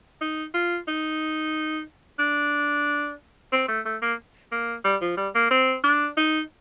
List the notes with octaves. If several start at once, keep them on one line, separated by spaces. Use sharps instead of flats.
D#4
F4
D#4
D4
C4
A3
A3
A#3
A#3
G3
F3
G3
A#3
C4
D4
D#4